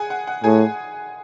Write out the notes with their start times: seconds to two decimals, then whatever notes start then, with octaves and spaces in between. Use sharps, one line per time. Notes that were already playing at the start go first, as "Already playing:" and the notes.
Already playing: G#4 F#5 G#5
0.10 F#5
0.27 F#5
0.44 A2 G#4 G#5